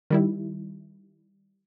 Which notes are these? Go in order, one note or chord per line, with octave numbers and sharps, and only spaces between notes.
D#3 G3 E4